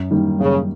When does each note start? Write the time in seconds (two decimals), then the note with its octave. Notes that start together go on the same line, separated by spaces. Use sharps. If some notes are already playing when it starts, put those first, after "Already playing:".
Already playing: F#2
0.11 D#3 G3 A#3
0.39 F#2 C#3